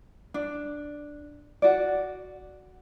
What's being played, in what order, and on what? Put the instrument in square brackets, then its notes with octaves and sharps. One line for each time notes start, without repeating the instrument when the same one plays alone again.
[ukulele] D4
F#4 D5